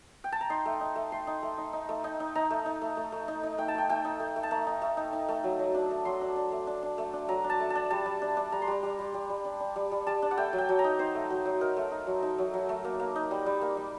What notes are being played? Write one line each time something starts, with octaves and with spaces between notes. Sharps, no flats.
G5
A5
A#5
D#4 C6
A3
D#4
A3
A3 C6
D#4
A3
D#4
D#4
A3
D#4
D#4
D#4 A#5
A3
D#4
A3
A3
A3
D#4
D#4
A3 G5
A5
A3 G5
A3 G5
D#4
A3
A3
A5
A3 A#5
D#4
A3
D#4
D#4
A3
F#3
F#3
D4
A3
F#3 C6
D4
D4
A3
D4
D4
A3
D4
F#3 A#5
D4
A5
A3
A5
D4
G3 A5
G3
D4
D4
G3 A#5
C6
G3 A#5
G3
G3
G3
G3
D4
D4
G3
G3
G3 A5
D4
F#5
A3 G5
F#3
G5
F#3
A#5
D#4
D#4 C5
A3
F#3
F#3
D#4 A#4
A3
D#4
F#3
D#4
F#3
F#3
A3
A#3
A#3
D#4
G3
G3
A#3
G3